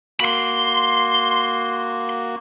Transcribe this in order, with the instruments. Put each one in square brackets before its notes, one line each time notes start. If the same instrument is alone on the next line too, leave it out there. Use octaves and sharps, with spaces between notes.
[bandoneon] A#3 F#4 [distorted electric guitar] B5 C6